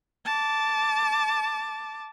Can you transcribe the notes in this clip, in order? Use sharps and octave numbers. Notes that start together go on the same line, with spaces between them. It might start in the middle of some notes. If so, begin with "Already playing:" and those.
A5 D6